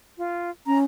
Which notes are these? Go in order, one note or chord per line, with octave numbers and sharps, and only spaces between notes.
F4
C#4 A#5